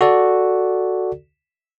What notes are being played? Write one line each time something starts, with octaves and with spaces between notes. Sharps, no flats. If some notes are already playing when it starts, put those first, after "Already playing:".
F#4 A4 D5